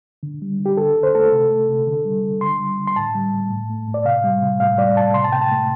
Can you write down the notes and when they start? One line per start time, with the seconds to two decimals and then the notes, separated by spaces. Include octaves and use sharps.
0.23 D3
0.42 G3
0.59 D3
0.66 G4
0.77 D3 A4
0.97 D3
1.03 C5
1.15 A3 A4
1.32 C3
1.51 A3
1.69 C3
1.87 D3
2.05 G3
2.24 D3
2.41 D3 C6
2.60 G3
2.79 D3
2.87 C6
2.96 A2 A5
3.15 G3
3.33 A2
3.50 A2
3.69 A3
3.88 A2
3.94 D5
4.05 C3 F5
4.24 G3
4.42 C3
4.60 A2 F5
4.78 G3 D5
4.96 A2 A5
5.14 C3 C6
5.24 A5
5.32 C3 G5
5.42 A5
5.52 A3